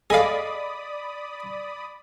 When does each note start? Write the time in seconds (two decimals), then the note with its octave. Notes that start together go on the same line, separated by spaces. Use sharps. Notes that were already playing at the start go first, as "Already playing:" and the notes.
0.10 G#4 A4 D5 D#5 F5 B5 D#6